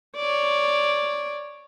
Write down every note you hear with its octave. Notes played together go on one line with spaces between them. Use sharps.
C#5 D5